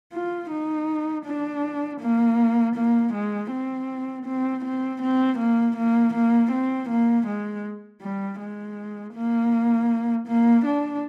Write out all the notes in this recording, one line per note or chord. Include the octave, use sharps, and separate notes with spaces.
F4
D#4
D4
A#3
A#3
G#3
C4
C4
C4
C4
A#3
A#3
A#3
C4
A#3
G#3
G3
G#3
A#3
A#3
D4